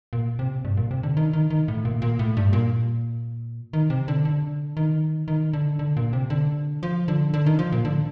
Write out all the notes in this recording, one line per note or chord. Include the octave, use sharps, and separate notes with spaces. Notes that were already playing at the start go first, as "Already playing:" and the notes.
A#2
C3
G2
A#2
C3
D3
D#3
D#3
D#3
A2
A#2
A#2
A2
G2
A#2
D#3
C3
D3
D3
D#3
D#3
D3
D3
A#2
C3
D3
F3
D3
D3
D#3
F3
A#2
D3